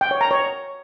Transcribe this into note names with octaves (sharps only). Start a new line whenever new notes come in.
G5
C#5
A#5
C#5